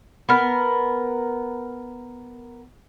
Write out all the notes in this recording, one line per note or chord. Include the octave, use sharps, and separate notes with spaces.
B3 A#4